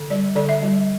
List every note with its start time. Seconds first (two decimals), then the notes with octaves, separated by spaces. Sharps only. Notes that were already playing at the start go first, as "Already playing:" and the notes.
Already playing: D3
0.10 G3 D5
0.35 D3 D5
0.49 E5
0.62 G3